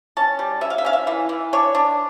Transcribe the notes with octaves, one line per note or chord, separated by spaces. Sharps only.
C#4 A5
G3
C#4 E5
F5
E5
C#4 F5
E5
E3
E3
D4 C#5
D4